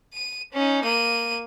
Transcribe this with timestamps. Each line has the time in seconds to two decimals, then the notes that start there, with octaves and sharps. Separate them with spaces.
0.14 D#7
0.52 C#4 D#4
0.84 A#3 D#7